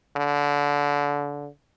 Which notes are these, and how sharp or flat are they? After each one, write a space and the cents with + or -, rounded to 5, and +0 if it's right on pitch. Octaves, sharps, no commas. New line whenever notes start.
D3 -25